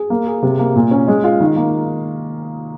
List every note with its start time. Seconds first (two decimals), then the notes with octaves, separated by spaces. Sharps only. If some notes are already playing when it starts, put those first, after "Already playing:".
Already playing: G#4
0.10 A#3
0.26 G#4
0.42 C3
0.59 A#3
0.76 A#2
0.91 C#4
1.08 G#3
1.24 F4
1.41 D#3
1.56 A#3